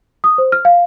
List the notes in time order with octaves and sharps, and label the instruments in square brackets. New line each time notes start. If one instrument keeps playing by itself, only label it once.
[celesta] D#6
C5
F6
F5